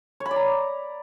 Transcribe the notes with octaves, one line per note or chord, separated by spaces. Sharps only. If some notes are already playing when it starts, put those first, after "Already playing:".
C#5
B5
D5
A#5